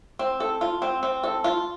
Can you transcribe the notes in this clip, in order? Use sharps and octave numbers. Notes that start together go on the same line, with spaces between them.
C4
A4
F4
C4
C4
A4
F4